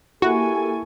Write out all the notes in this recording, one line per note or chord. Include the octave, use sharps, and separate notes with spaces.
A#3 E4 F#4 G4 A4 G#5 C#6